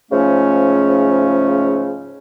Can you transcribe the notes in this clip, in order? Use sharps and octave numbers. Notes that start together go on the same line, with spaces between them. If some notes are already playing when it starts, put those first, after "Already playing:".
G#2 C#3 F3 A3 C#4